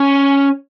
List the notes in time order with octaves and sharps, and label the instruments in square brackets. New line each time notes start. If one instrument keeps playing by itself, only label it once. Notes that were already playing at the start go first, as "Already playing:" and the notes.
Already playing: [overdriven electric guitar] C#4